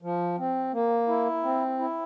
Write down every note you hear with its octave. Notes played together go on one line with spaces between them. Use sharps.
F3
C4
A#3
E4
C4
E4